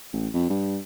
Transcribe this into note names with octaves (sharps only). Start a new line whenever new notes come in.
A1
F2
G2